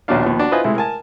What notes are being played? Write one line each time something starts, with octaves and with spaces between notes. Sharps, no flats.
A#1 D#2 B2 C#4 D4 F5
D#2 F3 B3
D4 F#4
E4 F4 B4 C5 D#5 G#5
C3 G#3 A3 E4
A#4 G#5 A5